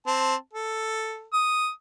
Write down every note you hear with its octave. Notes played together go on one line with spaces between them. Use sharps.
C4 A5
A4
D#6